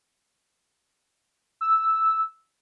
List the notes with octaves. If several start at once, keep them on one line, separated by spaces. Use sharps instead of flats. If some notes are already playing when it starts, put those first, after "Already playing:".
E6